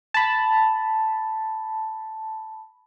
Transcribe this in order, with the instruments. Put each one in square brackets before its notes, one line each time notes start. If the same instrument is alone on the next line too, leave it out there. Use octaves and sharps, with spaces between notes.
[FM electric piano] A5 B5